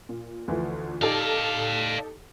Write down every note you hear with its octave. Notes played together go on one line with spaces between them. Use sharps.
A#2
D2 E3 F3
D#4 G4 A4 D5 F5